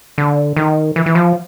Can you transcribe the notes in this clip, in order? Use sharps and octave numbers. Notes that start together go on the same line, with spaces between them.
D3
D#3
E3
E3
F3